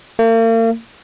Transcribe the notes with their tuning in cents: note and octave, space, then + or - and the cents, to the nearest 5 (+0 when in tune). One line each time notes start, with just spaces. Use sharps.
A#3 -45